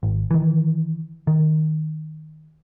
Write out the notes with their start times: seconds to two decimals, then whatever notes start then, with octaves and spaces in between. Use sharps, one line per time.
0.03 G#1
0.31 D#3 E3
1.27 D#3